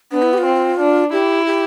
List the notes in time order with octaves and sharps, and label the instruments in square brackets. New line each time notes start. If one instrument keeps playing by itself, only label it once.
[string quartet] B3 [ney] D4
[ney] E4
G4
F4
[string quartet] C4
D4
[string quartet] E4 [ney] G4
[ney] G4